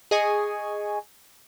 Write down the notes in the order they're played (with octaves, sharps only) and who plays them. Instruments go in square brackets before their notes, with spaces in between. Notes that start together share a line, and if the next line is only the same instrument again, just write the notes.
[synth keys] G#4 D#5 G#5 C#6